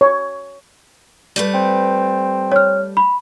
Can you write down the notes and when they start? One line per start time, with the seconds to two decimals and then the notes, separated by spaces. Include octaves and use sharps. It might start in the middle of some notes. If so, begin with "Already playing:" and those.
0.01 C#5
1.36 G3 A3 B4
1.54 C4
2.52 C#5 F6
2.97 B5